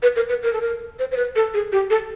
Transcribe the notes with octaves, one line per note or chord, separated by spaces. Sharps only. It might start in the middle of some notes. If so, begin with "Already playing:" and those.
B4
A#4
B4
A#4
A4
A#4
C5
C5
B4
A4
G#4
G4
A4